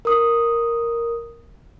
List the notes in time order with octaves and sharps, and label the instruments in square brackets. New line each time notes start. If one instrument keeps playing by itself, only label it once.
[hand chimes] A#4 D#6